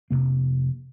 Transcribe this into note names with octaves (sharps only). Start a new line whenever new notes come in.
F1 D#2 C3 A#3